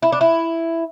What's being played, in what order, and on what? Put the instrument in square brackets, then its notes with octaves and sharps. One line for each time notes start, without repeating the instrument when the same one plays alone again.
[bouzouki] E4
D4
E4